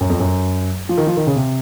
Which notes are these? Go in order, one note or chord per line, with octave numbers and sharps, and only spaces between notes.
F#2
F2
F#2
F3
D#3
F3
D#3
C#3
C3